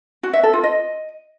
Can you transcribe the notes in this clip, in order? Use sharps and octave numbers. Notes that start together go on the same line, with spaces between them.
F#4
E5
A4
F4
D#5